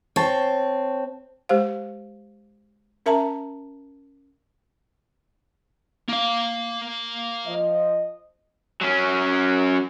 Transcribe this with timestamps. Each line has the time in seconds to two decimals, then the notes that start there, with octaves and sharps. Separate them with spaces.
0.16 C4 C#5 A5
1.49 G#3 G4 C5 F5
3.06 C#4 A#4 E5 A5 A#5
6.08 A#3 F5
7.46 F3 D#5
8.81 F#3 C#4